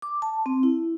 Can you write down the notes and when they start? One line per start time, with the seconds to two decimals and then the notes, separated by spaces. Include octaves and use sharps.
0.02 D6
0.22 A5
0.46 C4
0.63 E4